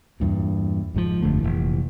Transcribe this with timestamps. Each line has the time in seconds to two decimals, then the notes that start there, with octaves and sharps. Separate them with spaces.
0.20 E2 G2 A#2
0.94 F#1 G#2 B2 F3
1.22 G1 F2 D3 A3
1.40 F1 B1 A#2 E3